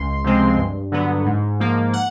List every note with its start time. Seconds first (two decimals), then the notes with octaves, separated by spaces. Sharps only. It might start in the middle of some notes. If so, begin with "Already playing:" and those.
Already playing: C#2 C6
0.24 C3 F3 G#3 C4
0.57 G2
0.92 D3 F#3 B3
1.26 G#2
1.60 F3 A#3
1.93 F#5